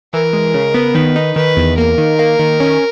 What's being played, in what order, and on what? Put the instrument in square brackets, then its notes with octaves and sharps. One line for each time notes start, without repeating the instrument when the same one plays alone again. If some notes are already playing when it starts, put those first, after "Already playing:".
[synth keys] E3 [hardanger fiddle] A#4
[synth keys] G#3
C#3
B3
[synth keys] D#3 [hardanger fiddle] B4
[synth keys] D#4
[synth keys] D#3 [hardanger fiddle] B4
[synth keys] E2
[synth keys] A#3 [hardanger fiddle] A#4
[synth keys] D#3
A#3
D#3
C#4